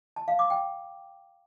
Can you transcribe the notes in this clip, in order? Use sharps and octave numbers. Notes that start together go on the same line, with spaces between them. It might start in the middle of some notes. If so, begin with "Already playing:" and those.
A5
F5
D6
G5